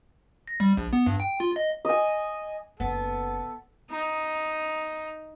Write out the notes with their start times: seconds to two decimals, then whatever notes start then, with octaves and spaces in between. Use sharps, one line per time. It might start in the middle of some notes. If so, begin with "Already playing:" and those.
0.48 A#6
0.60 G3
0.77 A#1
0.93 B3
1.06 G2
1.20 G5
1.40 F4
1.56 D#5
1.85 D#5 G#5
2.80 F#1 B3 A4
3.90 D#4